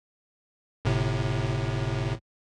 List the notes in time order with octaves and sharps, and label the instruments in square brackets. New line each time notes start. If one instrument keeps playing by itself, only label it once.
[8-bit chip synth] G1 A2 C3